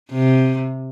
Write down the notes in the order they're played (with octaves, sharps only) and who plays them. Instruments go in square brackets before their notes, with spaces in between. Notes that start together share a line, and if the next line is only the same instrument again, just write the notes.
[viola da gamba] C3